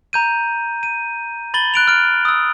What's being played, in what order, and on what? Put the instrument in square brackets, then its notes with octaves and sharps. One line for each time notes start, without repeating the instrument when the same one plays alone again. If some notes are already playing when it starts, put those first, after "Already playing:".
[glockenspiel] A#5 G6 D#7
D#7
B5 A6 F#7 G7
F#6 D7 F7
F6 D7
D#6 E6